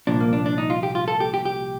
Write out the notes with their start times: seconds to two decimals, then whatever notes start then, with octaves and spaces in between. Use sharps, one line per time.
0.07 C2 A#2 F3 D4
0.20 A#3
0.33 D4
0.46 D4
0.58 D#4
0.70 F4
0.83 G4
0.95 F4
1.08 A4
1.20 G4
1.34 G4
1.45 G4